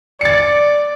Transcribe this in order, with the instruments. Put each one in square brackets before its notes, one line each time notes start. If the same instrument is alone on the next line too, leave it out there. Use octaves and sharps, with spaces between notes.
[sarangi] D5 [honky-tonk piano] A6 C#7